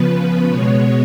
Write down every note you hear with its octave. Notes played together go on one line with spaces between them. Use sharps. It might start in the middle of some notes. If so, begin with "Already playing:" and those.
Already playing: C#3 F3 B3 B4
B2 G#3 B3 C#5